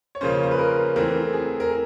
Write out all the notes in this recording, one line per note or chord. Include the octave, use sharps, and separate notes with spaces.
C#5
C#3 F3 A#3 C#4 C5
C5
B4
A#4
E3 A3 C4 A#4
G#4
A#4